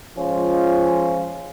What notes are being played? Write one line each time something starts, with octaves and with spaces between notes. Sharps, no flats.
F3 G#3 C#4 F4